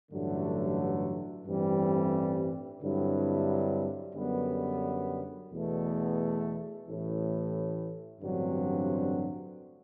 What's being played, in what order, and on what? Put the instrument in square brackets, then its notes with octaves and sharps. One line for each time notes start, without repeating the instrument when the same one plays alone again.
[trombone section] A1 G2 D3 F#3 A3
A1 G2 E3 G3 C4
G2 D3 F#3 C4 E4
F#2 D3 G3 B3
E2 B2 A3
A1 A2 E3
A1 G2 D3 F#3 C4